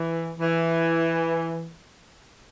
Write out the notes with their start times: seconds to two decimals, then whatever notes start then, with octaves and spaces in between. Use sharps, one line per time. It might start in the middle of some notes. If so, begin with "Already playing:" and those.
Already playing: E3
0.39 E3